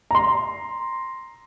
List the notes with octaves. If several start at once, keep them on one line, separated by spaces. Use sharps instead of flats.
A#5 C6